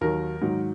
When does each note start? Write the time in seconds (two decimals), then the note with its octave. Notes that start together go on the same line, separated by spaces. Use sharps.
0.01 D#2 D#3 F#3 A#4
0.42 G#2 D#3 F#3